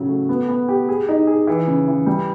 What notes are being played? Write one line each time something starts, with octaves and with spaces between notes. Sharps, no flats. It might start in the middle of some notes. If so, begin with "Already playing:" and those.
Already playing: A2 C#3 F#3
A3
B3
B3
G4
G#4
D#4
G#4
E3
C#3
E3
G3